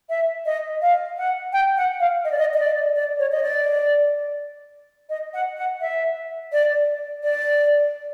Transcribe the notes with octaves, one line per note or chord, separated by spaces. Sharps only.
E5
D#5
F5
F#5
G5
F#5
F5
D#5
D5
D#5
D#5
D5
D5
C#5
D#5
D5
D#5
F#5
F#5
E5
D5
D5